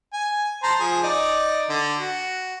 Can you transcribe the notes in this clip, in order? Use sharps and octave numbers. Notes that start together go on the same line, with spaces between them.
G#5
C5 A5 A#5
F3 G#4
D#4 D5
D3
F#4